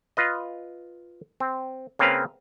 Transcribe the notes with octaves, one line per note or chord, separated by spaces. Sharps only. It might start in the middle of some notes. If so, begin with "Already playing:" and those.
F4 B4 D#5
C4
C#3 A#3 C4 C#4 B4 F5